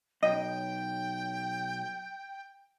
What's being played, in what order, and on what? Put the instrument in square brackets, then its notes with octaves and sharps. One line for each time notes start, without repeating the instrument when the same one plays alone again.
[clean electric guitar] B1 [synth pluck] D#5 [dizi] G5